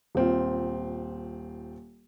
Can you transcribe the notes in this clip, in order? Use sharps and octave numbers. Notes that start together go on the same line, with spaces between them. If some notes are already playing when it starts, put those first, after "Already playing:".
D#1 C4 F4